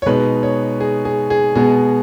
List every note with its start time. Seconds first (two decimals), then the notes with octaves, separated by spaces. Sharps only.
0.02 C#5
0.06 B2 G#3 D#4 B4
0.43 C#5
0.80 G#4
1.05 G#4
1.30 G#4
1.55 B2 G#3 B3 G#4